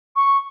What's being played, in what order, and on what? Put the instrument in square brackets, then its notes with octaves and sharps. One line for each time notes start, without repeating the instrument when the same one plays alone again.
[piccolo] C#6